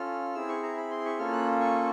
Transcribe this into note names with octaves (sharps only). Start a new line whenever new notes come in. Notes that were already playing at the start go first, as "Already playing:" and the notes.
Already playing: C#4 F4 A4 F6
C4 E4 G#4 E6
C#6
A#5
B5
C6
C#6
A#3 C#4 F4 A4 F6
F#6
C#6